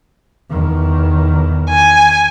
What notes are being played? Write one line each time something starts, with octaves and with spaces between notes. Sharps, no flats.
E2 D#3
G#5